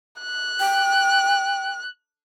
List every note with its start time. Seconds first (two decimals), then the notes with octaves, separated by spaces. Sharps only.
0.21 F#6
0.60 G5